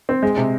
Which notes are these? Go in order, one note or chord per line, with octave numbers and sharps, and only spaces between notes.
C4
G#3
C3